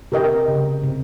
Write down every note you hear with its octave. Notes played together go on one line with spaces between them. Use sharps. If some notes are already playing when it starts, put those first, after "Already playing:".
C3 G4 A#4 D#5 G5
C#3
C3